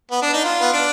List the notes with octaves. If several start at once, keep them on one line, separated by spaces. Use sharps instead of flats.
B3
D4
D#4
F4
B3
D4